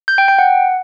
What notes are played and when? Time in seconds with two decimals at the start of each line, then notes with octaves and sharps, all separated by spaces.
0.08 G6
0.18 G5
0.28 G5
0.39 F#5